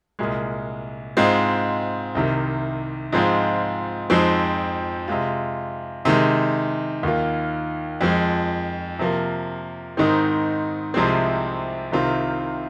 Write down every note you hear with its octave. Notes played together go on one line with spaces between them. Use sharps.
C2 A#2 G#3
G#2 G#3 C4 F4
C2 C3 D#3
G#2 F3 G#3 C4 F4
F2 F3 G#3 C4 D#4
C3 G#3 F4
C3 D#3 G#3
D#2 D#3 A#3 F4
F2 F3 G#3
C3 F3 A#3
G#2 D#3 C4 D#4
C2 C3 F3 G#3 C4
C2 C3 D#3 C4 F4